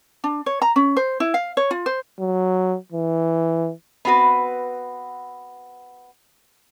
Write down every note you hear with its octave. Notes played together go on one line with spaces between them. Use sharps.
D4
C#5
A#5
C#4
C5
E4
F5
C#5
F4
C5
F#3
E3
B3 C4 F#4 B4